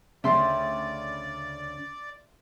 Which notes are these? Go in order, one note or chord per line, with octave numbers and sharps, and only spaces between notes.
D2 C#3 C#4 D5 E5 G5 C6